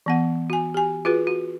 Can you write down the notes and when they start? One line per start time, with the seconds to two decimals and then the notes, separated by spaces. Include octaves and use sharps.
0.06 E3 B3 F#5
0.50 F#4 G#5
0.74 G4 G#5
1.05 F4 F#4 G#4 B4
1.27 F#4